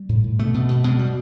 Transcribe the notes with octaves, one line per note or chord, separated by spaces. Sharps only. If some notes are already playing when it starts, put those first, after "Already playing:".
Already playing: G3
A2
A2
B2 A3
B2
B2
B2 G#3
B2 G3